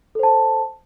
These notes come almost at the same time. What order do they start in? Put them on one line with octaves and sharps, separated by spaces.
A4 C5 A5